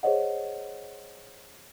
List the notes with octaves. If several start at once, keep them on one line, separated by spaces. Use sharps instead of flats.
G#4 C5 C#5 D#5 F#5